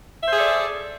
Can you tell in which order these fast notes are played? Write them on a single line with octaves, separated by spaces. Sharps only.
E5 C5 G#4 A4 D5